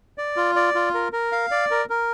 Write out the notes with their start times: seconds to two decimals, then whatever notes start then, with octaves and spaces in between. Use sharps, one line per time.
0.18 D5
0.37 F4
0.56 D5
0.75 F4
0.94 A#4
1.13 A#4
1.32 F5
1.51 D5
1.71 A#4
1.90 A#4